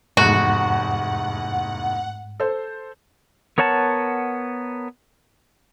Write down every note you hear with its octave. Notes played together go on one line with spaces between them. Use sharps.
F1 E2 G#2 F#4 F#5 F#6
A4 C5
B3 A#4 C#5 F#5 A5